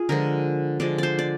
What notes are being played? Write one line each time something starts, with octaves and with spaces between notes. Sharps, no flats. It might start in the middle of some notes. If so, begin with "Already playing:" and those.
Already playing: F4 G#4
D3 F3 G#3 A#4
D3 F3 G#3 D5
C5 D5
D5